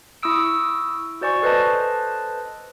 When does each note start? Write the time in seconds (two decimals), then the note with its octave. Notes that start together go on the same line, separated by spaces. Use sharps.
0.23 E4 C#6 D#6 E6 D7
1.21 F#4 C5 D5 G#5 C#6
1.42 A4 B4 C5 D#5 A5